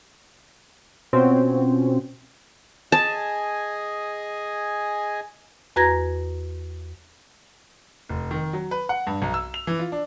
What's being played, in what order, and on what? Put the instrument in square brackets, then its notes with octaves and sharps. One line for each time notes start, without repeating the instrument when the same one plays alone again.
[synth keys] B2 C4 C#4 F4 F#4
[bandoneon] G#4 D#5 G#5 [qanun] A5
[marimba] E2 F#4 B4 A#5 G#6 A#6
[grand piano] F1
D#3
F#3
B4
F#5
G2
B1
E6
F7
E3
F4
D4